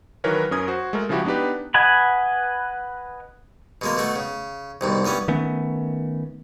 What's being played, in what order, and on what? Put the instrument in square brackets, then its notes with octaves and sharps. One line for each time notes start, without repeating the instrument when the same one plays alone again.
[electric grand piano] D#3 E3 F#3 A#4 B4 C#5
F#2 C#4 A#4 D#6 G#6
F#4 C5
G#3 A3 A#4
C#3 F3 G#3 E4 F#4 G4
B3 D4 D#4 G4 B4
[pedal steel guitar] B4 D#5 F#5 G#5 B5
[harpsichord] B2 G#3 A#3
B2 A3 F#4
C#3
C2 G#2 B2
G2 E3 B3 C#4
[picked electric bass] D#3 A3 B3 C#4